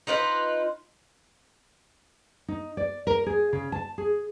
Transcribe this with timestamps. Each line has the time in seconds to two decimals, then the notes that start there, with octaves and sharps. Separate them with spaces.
0.07 D#4 F4 B4 C5
2.48 D#4
2.77 D5
3.07 A#4
3.26 G#4
3.53 C#3
3.72 A5
3.98 G#4